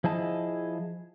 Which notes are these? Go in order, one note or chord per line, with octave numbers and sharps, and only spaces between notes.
F3 E4 G#4 D#5 A5